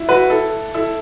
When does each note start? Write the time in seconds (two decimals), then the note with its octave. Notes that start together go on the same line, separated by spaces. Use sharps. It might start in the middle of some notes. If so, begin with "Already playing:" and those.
Already playing: E4
0.09 F#4 B4
0.30 E4 A4
0.74 E4 A4